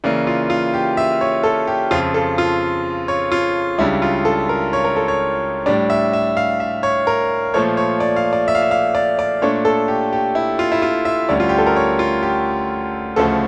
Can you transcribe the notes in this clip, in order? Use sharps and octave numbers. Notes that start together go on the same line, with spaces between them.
C#3 E3 A#3 D5
F4
F4
G4
E5
C#5
A4
G4
F2 C#3 F3 F4
A4
F4
C#5
F4
C#2 C#3 G3 D4 E4
F4
A4
A#4
C#5
A#4
A4
C#5
A2 G3 D4 D5
E5
E5
F5
E5
C#5
A#4
A#2 F3 A3 C#5
C#5
D5
F5
D5
E5
F5
E5
F5
D5
D5
A#2 A3 D4 C#5
A4
G4
G4
E4
F4
E4
F4
E5
D2 D3 G3 C#4 D5
F4
G4
A4
A#4
C#5
F4
G4
D2 C#3 F3 A3 A4